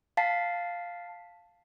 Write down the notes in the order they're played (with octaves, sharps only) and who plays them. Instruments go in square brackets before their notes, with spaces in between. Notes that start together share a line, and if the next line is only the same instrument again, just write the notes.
[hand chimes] F5 A5 A6 B6 C7